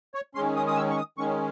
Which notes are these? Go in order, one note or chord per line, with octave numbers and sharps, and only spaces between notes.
C#5
D#3 G#3 C#4 C6
D#6
D#6
E6
C#6
D#6
D#3 G#3 C#4 C#6